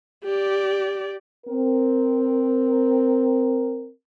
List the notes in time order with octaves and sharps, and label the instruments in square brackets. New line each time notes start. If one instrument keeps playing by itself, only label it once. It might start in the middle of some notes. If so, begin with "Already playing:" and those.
[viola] G4 D5
[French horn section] C4 A#4